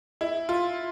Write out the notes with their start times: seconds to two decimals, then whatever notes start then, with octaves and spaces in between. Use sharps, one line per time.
0.21 E4
0.49 F4